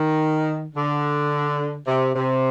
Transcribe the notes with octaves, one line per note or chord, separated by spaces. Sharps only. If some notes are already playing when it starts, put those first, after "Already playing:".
Already playing: D#3
D3
C3
C3